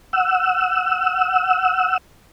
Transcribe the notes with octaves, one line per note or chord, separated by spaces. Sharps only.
F#5 E6